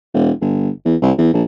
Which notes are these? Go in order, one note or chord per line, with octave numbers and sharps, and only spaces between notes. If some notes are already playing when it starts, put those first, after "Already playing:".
E1
G1
E2
C2
E2
A#1